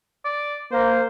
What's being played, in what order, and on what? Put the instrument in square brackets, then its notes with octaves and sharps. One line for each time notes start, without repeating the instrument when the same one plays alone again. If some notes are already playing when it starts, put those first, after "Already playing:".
[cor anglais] D5
[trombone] A#3 [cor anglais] C5